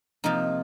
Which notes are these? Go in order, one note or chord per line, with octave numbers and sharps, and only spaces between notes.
C3 F3 A#3 D#4